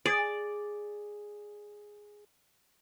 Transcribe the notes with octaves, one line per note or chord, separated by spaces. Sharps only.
G#4 D5